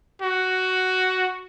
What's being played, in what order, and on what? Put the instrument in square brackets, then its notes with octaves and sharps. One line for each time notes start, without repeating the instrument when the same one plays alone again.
[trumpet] F#4